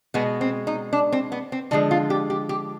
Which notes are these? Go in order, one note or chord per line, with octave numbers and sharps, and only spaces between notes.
B2 G#3 B3
C4
D#4
D4
C4
B3
C4
D3 F3 G#3 D4
F4
G4
G4
G4